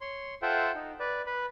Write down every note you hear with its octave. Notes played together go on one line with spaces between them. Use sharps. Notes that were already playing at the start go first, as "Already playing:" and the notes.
C#5 C6
F4 A4 C5 E5 F#5 G5
D#4
B4 D5
B4 B5